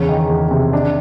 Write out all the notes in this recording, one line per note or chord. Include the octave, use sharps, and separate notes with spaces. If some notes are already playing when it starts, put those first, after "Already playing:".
Already playing: E2 C#3 C#4
D#3
E2
C3
D#3 D4